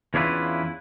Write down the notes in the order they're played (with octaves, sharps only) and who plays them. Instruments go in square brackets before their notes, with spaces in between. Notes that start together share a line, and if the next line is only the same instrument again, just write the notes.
[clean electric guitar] E2 C#4 D4 E4 F4 B4